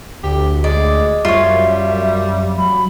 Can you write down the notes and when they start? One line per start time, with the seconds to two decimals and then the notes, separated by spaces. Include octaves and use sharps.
0.23 D2 G4
0.64 G#3 D5
1.25 F#2 G3 F4 C#5 E5
2.58 F#3 B5